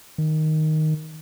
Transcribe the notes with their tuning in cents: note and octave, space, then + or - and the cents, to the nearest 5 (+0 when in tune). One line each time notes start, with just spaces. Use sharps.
D#3 +0